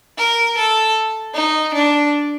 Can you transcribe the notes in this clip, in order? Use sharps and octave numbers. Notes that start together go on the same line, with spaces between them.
A#4
A4
D#4
D4